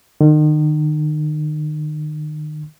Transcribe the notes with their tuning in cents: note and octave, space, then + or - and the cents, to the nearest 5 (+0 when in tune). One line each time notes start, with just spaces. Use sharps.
D#3 -35